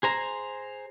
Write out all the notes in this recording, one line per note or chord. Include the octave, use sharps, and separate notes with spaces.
G#4 C5 A#5